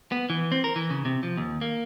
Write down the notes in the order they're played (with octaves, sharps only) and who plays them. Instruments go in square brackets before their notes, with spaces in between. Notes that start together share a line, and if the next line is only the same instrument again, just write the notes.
[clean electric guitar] B3
E3
C4
A#4
E3
C#3
C3
F3
D#2
A#3